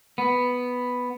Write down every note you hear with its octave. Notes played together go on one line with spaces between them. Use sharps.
B3